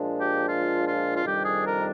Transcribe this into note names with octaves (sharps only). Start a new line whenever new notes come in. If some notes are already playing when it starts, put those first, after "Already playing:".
Already playing: A#2 F3 G#3 D4
G4
F4
F4
F4
F2 C3 D#3 G3 D4 G4
G#4
A#4